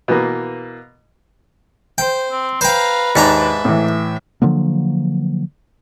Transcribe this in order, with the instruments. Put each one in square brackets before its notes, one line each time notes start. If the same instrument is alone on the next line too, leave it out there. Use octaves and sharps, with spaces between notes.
[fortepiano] B2 E3 A#3
[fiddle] C5 [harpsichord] G5
[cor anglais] C4
[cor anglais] B4 [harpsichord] C5 G5 [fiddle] F5 A#5
[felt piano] D#2 [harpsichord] G#2 D4 A#5 [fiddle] E5
[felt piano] A2 E3
[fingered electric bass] D3 F3 F#3 A#3